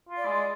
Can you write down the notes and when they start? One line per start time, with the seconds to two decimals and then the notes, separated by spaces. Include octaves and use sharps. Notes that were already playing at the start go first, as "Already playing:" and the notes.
0.09 F4
0.17 D5
0.26 G#3